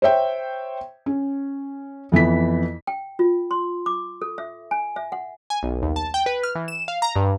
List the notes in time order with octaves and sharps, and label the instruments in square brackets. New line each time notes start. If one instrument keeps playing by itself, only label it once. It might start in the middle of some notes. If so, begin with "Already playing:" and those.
[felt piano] C5 C#5 E5 G5
C#4
F2 E3 B3 B6
[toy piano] G5
F4
C6
D6
A4
E5
G#5
E5
F#5
[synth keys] G#5
B1
D#2
A5
G5
B4
F6
E3
E7
F5
A#5
G2